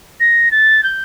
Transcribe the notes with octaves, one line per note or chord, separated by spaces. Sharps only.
A#6
A6
G6